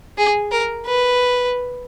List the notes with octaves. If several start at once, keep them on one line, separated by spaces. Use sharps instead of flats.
G#4
A#4
B4